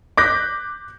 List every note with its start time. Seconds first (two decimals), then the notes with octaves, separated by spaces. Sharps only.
0.17 D6 F#6 G6 A#6 B6